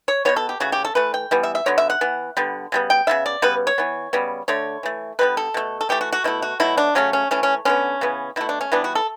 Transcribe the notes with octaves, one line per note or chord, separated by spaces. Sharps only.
C#5
B2 G3 B3 C#5
A4
G4
C#3 E3 A3 F#4
G4
A4
E3 A3 B4
G5
E3 G3 B3
E5
E5
D3 F#3 B3 C#5
E5
F#5
E3 B3
D3 G3 B3
C#3 G3 B3
G5
C#3 G3 B3 E5
D5
C#3 G3 B3 B4
C#5
E3 B3
C#3 G3 B3
D3 A3 C#5
E3 A3
D3 G3 B3 B4
A4
B2 A3
A4
E3 A3 G4
F#4
F#4
B2 A3 E4
F#4
B2 F#3 A3 E4
D4
C#3 F#3 A3 C#4
C#4
E3 A3 C#4
C#4
D3 G3 B3 C#4
C#3 E3 B3
B2 A3 E4
D4
C#4
E3 G3 B3 D4
F#4
A4